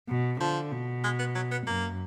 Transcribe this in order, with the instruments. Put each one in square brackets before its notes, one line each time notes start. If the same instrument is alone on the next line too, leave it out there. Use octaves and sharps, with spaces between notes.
[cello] B2
[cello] D3 [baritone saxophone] F3
[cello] B2
[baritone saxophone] G#3
B3
F#3
B3
[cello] F#2 [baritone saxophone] A#3